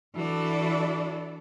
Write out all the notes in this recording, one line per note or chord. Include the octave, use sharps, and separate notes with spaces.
E3 D4 F#4 A4 D5